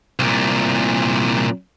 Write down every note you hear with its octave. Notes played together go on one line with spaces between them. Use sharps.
C2 A#2